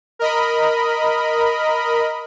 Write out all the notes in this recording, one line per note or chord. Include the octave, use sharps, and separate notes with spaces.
A#4 D#5 B5